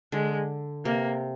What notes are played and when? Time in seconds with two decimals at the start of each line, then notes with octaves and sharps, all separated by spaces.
0.12 D3 G#3
0.85 C3 A#3